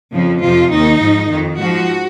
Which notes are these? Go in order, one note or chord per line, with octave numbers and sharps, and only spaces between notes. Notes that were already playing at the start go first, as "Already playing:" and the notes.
F2 C#3 F3
F2 C3 F3 F4
D#2 D#3 D#4
G#2 F3
F2 D#3
G#2 F3 F#4